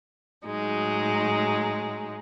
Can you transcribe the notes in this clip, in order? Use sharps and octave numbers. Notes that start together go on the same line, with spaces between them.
A2 F#3 G#3 D#4